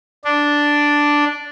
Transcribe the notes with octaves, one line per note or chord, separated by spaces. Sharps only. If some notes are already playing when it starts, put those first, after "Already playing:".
D4